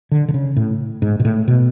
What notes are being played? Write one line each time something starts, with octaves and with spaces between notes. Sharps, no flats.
D3
D3
C#3
A2
G#2
B2
A2
B2